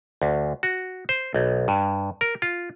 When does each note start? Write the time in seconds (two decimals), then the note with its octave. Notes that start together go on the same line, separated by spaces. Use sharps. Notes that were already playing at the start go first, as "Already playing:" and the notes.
0.22 D2
0.63 F#4
1.09 C5
1.34 B1
1.68 G2
2.21 A#4
2.42 F4